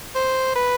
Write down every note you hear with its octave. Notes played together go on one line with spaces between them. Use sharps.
C5
B4